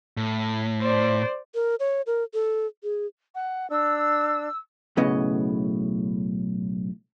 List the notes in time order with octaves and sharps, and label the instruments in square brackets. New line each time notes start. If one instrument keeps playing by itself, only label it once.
[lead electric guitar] A2
[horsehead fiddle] C5 D5
[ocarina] A#4
C#5
A#4
A4
G#4
[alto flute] F#5
[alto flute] D4 [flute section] E6
[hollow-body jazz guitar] B1 A2 C#3 B3 D#5